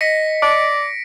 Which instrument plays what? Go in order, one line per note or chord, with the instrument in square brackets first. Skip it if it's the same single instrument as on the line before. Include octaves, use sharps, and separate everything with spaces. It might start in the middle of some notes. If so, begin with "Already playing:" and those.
[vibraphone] D#5 [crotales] A#6 B6 C#7
[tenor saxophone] D5 [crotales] D7